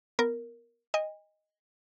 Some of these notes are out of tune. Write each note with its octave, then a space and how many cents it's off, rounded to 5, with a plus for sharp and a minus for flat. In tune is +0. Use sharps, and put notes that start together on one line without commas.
B3 +0 A#4 +0
D#5 +0 G#5 -45